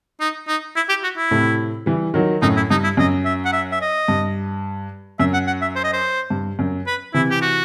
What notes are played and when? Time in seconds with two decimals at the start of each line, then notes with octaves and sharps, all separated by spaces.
0.20 D#4
0.48 D#4
0.76 E4
0.89 G4
1.03 F#4
1.17 E4
1.31 A2 C3
1.86 E3 G3
2.14 D#3 F#3
2.42 F#2 A2 D#4
2.56 E4
2.70 G2 D#4
2.84 E4
2.97 F#2 D#5
3.25 E5
3.45 F#5
3.53 E5
3.72 E5
3.81 D#5
4.08 G2
5.19 F#2 E5
5.33 F#5
5.47 F#5
5.62 E5
5.76 C5
5.84 D#5
5.93 C5
6.30 G2
6.59 F#2
6.87 B4
7.13 C3 E3 E4
7.30 G4
7.42 F#4